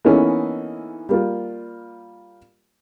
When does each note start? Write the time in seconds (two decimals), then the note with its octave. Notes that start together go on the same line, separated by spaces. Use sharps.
0.05 E3 A#3 B3 C#4 D#4 A4
1.09 G3 A#3 F4